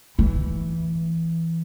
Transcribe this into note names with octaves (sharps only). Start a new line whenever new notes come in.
E3